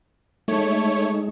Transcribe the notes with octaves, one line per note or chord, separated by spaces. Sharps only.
G#3 A3 D#4 C#5